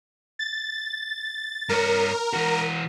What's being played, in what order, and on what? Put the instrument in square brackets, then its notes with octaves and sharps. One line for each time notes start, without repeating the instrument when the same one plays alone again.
[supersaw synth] A6
[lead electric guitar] G2 C#5 [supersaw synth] A#4
[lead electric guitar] E3 F#4